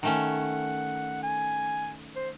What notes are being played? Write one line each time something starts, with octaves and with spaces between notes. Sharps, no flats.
D#3 A3 C#4 F#5
G#5
C5